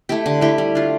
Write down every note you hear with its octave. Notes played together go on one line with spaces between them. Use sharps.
A3 E4 G4
D3
A3 E4 G4
G3
D4 F4